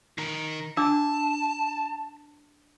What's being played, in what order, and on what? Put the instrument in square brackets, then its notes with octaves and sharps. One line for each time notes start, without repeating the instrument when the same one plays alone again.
[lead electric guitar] D#3 A#4
[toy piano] D4 D6 E6 [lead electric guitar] A5